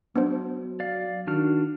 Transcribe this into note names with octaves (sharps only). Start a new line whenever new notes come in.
F#3 B3 D4 C5
D5 F5
D#3 D4 F#4 F6